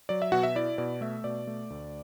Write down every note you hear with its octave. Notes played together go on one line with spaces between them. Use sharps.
F#3 D5
E5
B2 F#4 F#5
E5
E4 D5
B2 D5
A3 E5
B2 D5
A3
D2